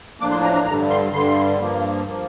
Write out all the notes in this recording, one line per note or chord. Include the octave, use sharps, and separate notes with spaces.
A2 F3 A#3 D4 D6
C6
A#5
A#5
G2 D3 G3 A#5
C6
G2 D3 G3 C6
G2 F3 A#3
F3 A#3